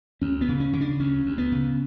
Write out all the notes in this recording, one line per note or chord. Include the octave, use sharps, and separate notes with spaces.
D2 C#4
B3
C#3
C#4
C#3
D4
D2 C#4
D2
B3
C#3